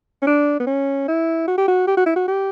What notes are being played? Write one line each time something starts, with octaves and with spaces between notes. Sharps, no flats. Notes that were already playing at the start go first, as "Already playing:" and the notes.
C#4
D4
B3
C#4
E4
F#4
G4
F#4
G4
F#4
E4
F#4
G4